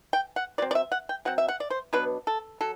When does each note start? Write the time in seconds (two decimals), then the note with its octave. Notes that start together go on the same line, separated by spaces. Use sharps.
0.13 G5
0.36 F#5
0.58 F#3 C4 D5
0.71 D5
0.75 E5
0.92 F#5
1.09 G5
1.25 F#3 C4 F#5
1.38 E5
1.48 F#5
1.60 D5
1.70 C5
1.93 B2 F#3 B3 D4 B4
2.27 A4
2.61 F#3 A4